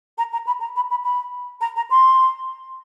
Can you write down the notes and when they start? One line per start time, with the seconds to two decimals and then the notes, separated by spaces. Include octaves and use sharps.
0.18 A#5
0.32 A#5
0.47 B5
0.60 A#5
0.76 B5
0.90 B5
1.03 B5
1.61 A#5
1.76 A#5
1.90 C6